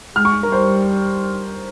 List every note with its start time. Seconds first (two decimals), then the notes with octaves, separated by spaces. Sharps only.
0.15 G#3 F6
0.25 C#6
0.43 A#4
0.52 G3 C5